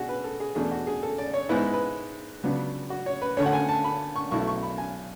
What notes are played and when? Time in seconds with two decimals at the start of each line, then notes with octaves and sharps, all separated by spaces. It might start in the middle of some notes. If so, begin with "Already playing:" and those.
Already playing: B2 D4 F#4 G#4
0.09 B4
0.24 A4
0.40 G#4
0.55 E2 B2 A3 D4 G#4
0.71 F#4
0.87 G#4
1.03 A4
1.18 D5
1.34 C#5
1.49 G#2 G#3 B3 E4 B4
1.73 B4
2.43 C#2 C#3 F#3 B3 D4
2.90 F#4
3.06 C#5
3.22 B4
3.37 D2 D3 A3 C#4 C#5
3.46 F#5
3.53 G#5
3.69 A5
3.84 B5
4.16 C#6
4.31 B1 B2 A3 E4 C#6
4.47 C#6
4.63 B5
4.78 G#5